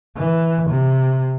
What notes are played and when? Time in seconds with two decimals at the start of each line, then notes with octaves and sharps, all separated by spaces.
0.17 E3
0.70 C3